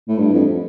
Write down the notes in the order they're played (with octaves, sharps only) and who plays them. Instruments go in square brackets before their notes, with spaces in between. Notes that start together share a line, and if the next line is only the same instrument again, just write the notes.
[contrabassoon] A2
G2
F2